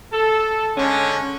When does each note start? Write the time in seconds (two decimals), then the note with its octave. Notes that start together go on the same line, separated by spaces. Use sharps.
0.12 A4
0.77 D3 G#3 C#4